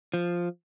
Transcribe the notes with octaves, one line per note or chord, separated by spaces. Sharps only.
F3